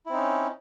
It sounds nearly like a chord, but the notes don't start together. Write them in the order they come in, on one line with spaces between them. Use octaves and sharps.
E4 C4 D#4 C#4